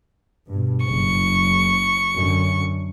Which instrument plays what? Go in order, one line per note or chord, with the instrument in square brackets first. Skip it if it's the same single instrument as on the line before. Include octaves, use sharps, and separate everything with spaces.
[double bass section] G2 B2
[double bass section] F#1 [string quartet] C#6
[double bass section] F#2 D3